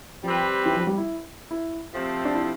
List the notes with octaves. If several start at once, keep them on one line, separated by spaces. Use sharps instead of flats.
F3 G3 C4 G4 B4
E3
F3
G3
E4
E4
C3 F3 A3 C4
D4
E4